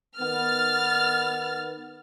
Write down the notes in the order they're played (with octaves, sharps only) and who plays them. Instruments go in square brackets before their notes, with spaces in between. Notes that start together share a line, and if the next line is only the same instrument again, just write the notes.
[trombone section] D#3 B3 [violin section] F6 A6